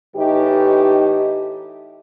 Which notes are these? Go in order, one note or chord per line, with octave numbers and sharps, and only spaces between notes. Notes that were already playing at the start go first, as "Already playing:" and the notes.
A2 E3 D#4 G4